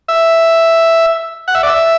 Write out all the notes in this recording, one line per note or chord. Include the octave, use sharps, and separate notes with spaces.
E5
F#5
E5
D5
E5